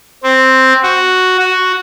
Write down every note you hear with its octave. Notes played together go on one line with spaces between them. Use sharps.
C4
F#4
F#4